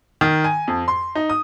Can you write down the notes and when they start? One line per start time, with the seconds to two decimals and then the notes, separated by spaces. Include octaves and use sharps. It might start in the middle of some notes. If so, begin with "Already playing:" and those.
0.21 D#3
0.44 G#5
0.68 F2
0.88 C6
1.15 D#4
1.30 D#6